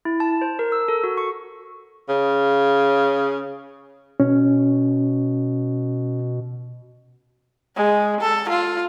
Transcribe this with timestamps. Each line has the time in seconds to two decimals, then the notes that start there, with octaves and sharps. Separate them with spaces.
0.05 E4
0.20 A5
0.41 C5
0.59 A#4
0.72 E6
0.88 A4
1.04 F#4
1.17 C#6
2.09 C#3
4.20 B2 C#4
7.76 G#3
8.21 A4
8.49 F4